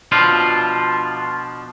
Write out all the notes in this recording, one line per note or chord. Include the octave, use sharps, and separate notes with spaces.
B2 F3 D4 F4